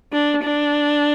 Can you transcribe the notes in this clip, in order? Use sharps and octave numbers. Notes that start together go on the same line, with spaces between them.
D4
D4